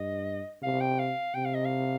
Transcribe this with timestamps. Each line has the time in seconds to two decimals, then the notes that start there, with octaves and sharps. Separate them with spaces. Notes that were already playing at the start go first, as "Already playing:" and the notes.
Already playing: G2 D#5
0.63 C3 F5
0.81 G5
0.99 F5
1.35 C3 G5
1.45 F5
1.55 D#5
1.65 F5